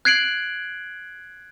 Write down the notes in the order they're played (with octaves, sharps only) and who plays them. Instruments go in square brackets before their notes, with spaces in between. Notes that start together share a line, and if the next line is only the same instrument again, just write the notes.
[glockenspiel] F#6 G#6 C7 D7 F#7